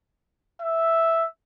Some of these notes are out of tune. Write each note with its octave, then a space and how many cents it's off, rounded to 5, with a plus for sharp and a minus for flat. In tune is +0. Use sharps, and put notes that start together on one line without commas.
E5 -5